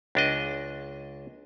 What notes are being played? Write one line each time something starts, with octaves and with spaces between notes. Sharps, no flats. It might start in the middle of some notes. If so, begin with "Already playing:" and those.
C#2 D4 D#5